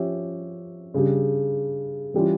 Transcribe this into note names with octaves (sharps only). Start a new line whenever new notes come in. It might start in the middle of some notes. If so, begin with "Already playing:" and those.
Already playing: F3 C#4 G4 C#5 E5
C#3 G3 D4 G4
E3 G3 C#4 F4